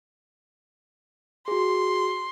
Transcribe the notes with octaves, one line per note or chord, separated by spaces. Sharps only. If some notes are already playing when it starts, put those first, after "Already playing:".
F#4 G#4 C6